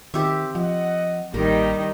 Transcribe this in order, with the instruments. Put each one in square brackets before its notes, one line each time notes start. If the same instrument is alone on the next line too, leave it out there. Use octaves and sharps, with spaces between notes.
[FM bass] D#3 [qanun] C4 G4 E5
[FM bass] F3 [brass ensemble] D#5 F#5
[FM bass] A1 [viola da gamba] D#3 G3 D#4 [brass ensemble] A#3 G4 [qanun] A#4